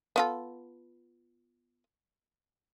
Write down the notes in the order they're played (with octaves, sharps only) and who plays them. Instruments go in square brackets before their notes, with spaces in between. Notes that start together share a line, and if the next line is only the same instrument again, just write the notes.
[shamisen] B3 F4 A4